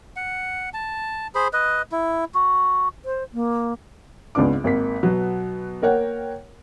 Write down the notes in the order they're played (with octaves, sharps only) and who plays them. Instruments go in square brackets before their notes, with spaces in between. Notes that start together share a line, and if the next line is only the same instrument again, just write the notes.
[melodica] F#5
A5
G#4 C5 B5
B4 D#5
E4
F#4
[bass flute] C5
A#3
[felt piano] G#1 C#2 C#3 B3 D4 D6
G#1 A#3 B6
B2 F#3 B3
A#3 A#4 C#5 F#5 G5